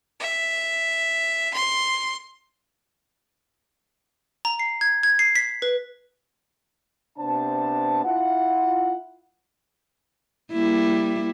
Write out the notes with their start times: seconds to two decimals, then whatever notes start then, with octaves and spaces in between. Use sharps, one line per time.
0.20 E5
1.54 C6
4.45 A#5
4.59 C7
4.81 G#6
5.03 G#6
5.19 C7
5.36 B6
5.62 B4
7.18 C3 B3 D4 C5 A5
8.05 E4 F4 F#5
10.53 G3 A#3 E4